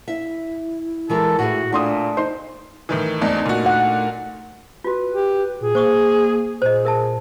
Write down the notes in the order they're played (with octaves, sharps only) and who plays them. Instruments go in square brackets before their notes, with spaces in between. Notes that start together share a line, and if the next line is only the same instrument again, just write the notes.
[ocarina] E4 [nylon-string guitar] E5
[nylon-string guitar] E3 G#3 A#4 [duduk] A4
[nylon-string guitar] A2 G#4 [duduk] F#4
[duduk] A#2 [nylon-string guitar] A3 [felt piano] D4 C6 D#6
[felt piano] D#4 C5 C6
[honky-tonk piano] A2 D#3 E3
[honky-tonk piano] G#1 E2 [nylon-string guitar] A3 D4 D#4
[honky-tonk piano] A#2 F#4
[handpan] F#5
[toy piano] F4 F#4 [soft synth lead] B4
[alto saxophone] G4
[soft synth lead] A#2 [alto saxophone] G#4
[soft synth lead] A#3 [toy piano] C5 C#6 D#6
[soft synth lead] A#2 [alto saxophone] G#4 [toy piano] C5 D#5
[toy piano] A#4 E5 A5